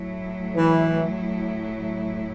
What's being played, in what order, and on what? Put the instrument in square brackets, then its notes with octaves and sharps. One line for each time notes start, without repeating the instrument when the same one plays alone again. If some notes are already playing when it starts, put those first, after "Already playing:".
Already playing: [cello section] A2 F#3 A3 E4
[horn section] E3